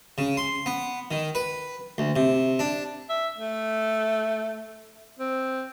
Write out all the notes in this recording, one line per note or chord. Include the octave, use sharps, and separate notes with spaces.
C#3
C6
B3
D#3
B4
D2
C3
D4
E5
A3
C4